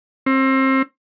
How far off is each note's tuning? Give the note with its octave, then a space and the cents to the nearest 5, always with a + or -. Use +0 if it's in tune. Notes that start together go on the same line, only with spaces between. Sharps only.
C4 +30